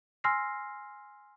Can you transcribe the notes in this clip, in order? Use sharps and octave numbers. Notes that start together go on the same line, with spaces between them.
G#5 C6 E6 F6 A#6 C7